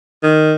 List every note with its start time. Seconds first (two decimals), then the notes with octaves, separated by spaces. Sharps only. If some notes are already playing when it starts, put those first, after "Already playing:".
0.23 D#3